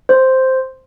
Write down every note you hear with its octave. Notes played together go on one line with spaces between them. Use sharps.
C5